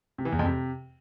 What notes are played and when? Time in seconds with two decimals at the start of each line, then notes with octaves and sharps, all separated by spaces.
0.18 C3
0.25 E3
0.32 E2
0.39 F2
0.46 C3